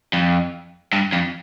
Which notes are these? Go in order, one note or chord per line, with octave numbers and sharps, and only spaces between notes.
F2
G2
F2